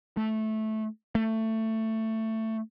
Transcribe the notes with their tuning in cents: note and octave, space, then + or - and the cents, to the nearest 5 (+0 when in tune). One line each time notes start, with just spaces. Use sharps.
A3 -10
A3 +15